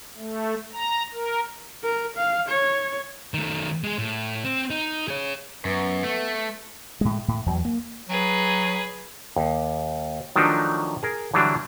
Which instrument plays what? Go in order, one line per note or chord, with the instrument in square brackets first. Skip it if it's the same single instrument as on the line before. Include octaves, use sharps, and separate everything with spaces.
[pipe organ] A3
A#5
A#4
[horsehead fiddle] A#4
F5
C#5
[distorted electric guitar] D#3 A3
G#3 G#4
A2
C4
D#4
G#4 C#5
[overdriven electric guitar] F#2 [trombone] B3
[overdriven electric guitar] A3
[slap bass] A2 G#3
A2
E2 F#3
A#3
[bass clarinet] F#3 [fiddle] G#4 B4
[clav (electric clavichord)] D#2
D#3 F3 F#3 A3 D4 D#4
G#4 A#4
D3 E3 F#3 G3 D4